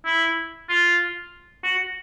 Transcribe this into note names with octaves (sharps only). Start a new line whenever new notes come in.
E4
F4
F#4